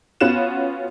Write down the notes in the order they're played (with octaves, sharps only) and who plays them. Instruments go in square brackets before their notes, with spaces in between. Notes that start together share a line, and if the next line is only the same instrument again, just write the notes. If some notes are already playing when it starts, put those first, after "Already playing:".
[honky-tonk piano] B3 C#4 F4 F#4 F#6 E7